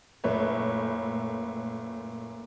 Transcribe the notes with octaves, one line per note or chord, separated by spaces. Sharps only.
F#1 A#2 A3 B4 C#5